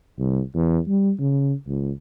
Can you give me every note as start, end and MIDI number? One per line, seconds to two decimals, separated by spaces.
0.19 0.40 36
0.55 0.78 40
0.88 1.11 55
1.19 1.53 49
1.67 1.91 37